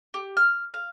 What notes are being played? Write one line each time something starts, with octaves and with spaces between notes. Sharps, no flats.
G4
F6
F5